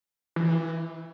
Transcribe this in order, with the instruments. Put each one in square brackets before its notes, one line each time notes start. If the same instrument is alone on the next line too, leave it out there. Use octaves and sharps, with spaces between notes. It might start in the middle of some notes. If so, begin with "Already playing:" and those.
[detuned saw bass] E3